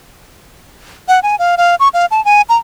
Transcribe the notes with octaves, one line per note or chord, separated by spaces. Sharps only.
F#5
G#5
F5
F5
C#6
F5
A5
G#5
A#5